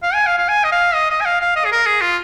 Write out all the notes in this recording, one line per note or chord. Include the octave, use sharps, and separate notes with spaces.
F5
G#5
F5
F5
G#5
D#5
F5
D#5
D#5
G#5
F5
F5
D#5
G#4
A#4
G#4
F4